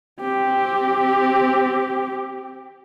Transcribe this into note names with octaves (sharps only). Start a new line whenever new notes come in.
C4 G4